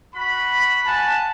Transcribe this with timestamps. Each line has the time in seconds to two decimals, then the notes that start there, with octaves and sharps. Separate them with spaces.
0.13 F#4 B5
0.85 F#5 G#5 A5